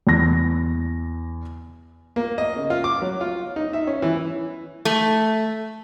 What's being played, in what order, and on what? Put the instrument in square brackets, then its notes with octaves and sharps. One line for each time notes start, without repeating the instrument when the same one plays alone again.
[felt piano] E2 A#6
[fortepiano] A#3
D#5
C#3
F4
D6
F#3
F4
D#4
E5
C#4
E3
[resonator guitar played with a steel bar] A3